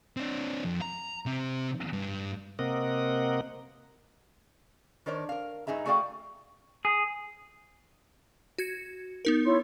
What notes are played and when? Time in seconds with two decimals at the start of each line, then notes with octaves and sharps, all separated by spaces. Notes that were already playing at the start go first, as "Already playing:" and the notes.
0.17 C4 D4
0.65 F2
0.82 A#5
1.26 C3 C4
1.93 G2
2.59 C3 A#3 C4 A#4 D#5 F#5
5.06 D#3 D4 A#4 C5 C#5
5.29 A#4 F5
5.67 G2 D#4 G#4 E5 A#5
5.86 A3 F#4 G#4 D5 F5 G5
6.85 G#4
8.58 F#4 G#6 C#7
9.25 B3 D#4 A#4
9.45 E4 C#5 C6